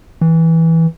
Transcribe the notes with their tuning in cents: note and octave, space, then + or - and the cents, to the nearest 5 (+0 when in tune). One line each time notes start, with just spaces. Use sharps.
E3 -10